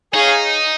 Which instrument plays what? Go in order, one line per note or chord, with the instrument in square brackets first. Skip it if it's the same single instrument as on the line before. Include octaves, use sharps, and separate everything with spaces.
[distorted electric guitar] D#4 [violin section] G#4 C#5 F5 G#5